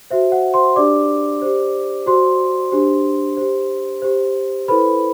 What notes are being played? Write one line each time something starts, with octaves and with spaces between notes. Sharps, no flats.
F#4 C5 E5
F#5
C5 C6
D4 G4 D5 D6
G4 C5
F#4 C5 C6
D4 G4 C5
G4 C5
G4 C5
E4 A4 B4 C5 B5